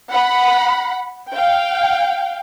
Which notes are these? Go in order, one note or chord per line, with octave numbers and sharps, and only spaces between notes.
F#5 B5
F5 G5